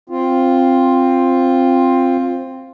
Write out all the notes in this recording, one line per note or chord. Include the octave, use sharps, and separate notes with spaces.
C4 F4